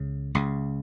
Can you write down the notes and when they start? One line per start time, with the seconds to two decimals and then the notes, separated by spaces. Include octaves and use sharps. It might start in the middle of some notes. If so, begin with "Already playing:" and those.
Already playing: C#2 C#3
0.35 C#2 C#3